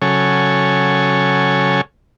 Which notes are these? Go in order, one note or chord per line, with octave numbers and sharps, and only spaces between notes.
C#3 F#3 A4 C#5 G#5